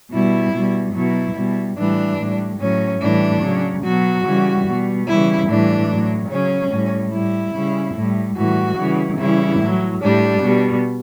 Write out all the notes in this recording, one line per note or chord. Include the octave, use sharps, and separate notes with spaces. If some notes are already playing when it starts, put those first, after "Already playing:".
B2 G3 E4
B2 G3
B2 F#3 E4
B2 G3
A2 E3 G3 D4
A2 G3
A2 F#3 C#4
A2 E3 G3 D4
C#3 F#3
B2 F#3 F#4
C#3 E3 G3
B2 G3
C#3 E3 G3 E4
A2 E3 G3 D4
A2 F#3
C#3 F#3 C#4
A2 G3
A2 G3 E4
C#3 G3
A2 G3
A2 E3 G3 F#4
C#3 E3 G3
C#3 E3 G3 E4
A2 F#3
A2 G3 D4
B2 G3